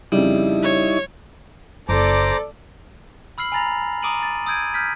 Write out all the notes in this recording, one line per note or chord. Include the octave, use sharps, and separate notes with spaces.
F2 C#3 G3 D#4 E4
C#5
F#1 A4 C5 D5 A#5 D6
B5 E6 F6 C7 F#7
G#5 A#5 B5 A6 A#6 F7
A#5 D6 D#6 D7 D#7 F#7
A6
D#6 E6 G6 G#6 D7 D#7
F6 G6 G#6 B6